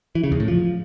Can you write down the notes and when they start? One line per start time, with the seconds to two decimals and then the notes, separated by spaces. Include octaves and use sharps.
0.15 E3
0.24 C#3
0.32 E2
0.40 A2
0.48 F3